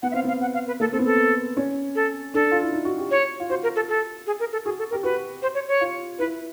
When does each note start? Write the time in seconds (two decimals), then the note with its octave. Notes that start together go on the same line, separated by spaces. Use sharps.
0.03 B3 F#5
0.11 C4 E5 F5
0.24 B3 F5
0.41 F#5
0.54 F5
0.67 B4
0.80 A#3 A4
0.92 C4 A4
0.99 B3
1.06 A4
1.57 C#4
1.95 A4
2.34 D4 A4
2.51 F4
2.62 E4
2.72 D#4
2.85 F#4
2.98 G4
3.11 C#5
3.40 F4
3.49 F#4 C5
3.63 A#4
3.76 A4
3.89 A4
4.27 G#4
4.40 A#4
4.52 A4
4.65 F#4 G#4
4.79 A4
4.90 G4 A#4
5.03 F#4 B4
5.42 C5
5.55 C#5
5.68 C#5
5.81 F4
6.19 E4 B4